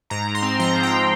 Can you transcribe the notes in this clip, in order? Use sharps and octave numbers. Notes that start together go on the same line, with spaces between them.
G#2 A#5
G#2
C6
C4
F3 A#5
G#2
G5